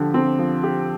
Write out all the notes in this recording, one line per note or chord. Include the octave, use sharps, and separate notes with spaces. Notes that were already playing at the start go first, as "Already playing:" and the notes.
Already playing: D3 F3 G4
C4
F3
G4